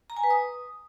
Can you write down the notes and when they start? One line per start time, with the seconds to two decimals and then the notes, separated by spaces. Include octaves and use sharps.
0.10 A#5
0.17 G#5
0.23 B4
0.30 D#6